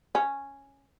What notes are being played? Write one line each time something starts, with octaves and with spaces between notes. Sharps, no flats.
C#4